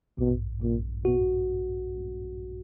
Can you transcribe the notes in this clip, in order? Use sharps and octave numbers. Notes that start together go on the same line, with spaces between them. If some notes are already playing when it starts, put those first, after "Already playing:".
A#1 B2
A#1 A#2
B2 F#4